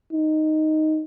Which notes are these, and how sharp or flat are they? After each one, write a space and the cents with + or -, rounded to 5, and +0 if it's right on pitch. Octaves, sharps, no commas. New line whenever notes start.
D#4 +0